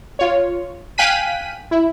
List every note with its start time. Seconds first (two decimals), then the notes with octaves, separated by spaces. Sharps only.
0.19 F4 C#5
0.98 F5 G5 G#5 F#6 B6 D#7
1.71 E4